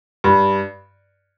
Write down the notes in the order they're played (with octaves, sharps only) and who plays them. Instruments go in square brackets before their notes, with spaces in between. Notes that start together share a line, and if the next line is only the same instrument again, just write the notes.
[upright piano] G2